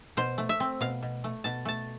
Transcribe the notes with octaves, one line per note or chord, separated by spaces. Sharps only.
B2 C5
A3
E5
C4
B2 F5
B2
A3
B2 A5
A3 A5